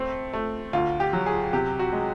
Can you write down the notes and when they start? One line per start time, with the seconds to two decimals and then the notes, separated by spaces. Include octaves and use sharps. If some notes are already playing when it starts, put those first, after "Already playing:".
Already playing: A3 C4
0.33 A3
0.73 D2 F4
1.00 G4
1.13 F#3
1.26 G#4
1.53 C3 G4
1.79 F#4
1.93 G#3